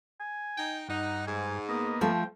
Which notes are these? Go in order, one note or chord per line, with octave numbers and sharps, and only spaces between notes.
G#5
D#4 G5
G2 D#4 F#5
G#2 G#5
A#3 B3 D#5
F3 A3 G5